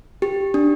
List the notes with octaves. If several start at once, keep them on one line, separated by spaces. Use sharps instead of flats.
G4
D4